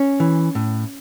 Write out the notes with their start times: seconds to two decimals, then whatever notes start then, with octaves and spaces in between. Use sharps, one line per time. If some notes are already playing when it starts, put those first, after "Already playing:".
Already playing: C#4
0.20 E3
0.55 A2